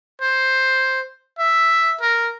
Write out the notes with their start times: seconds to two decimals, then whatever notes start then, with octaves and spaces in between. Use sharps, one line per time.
0.22 C5
1.39 E5
2.01 A#4